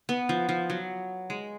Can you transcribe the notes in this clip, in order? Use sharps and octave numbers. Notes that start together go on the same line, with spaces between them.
B3
F3
F3
F#3
G#3